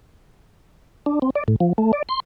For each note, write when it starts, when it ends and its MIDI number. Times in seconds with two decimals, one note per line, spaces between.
1.06 1.19 62
1.22 1.30 60
1.36 1.44 74
1.48 1.56 45
1.60 1.73 53
1.78 1.92 57
1.93 2.03 74
2.09 2.20 84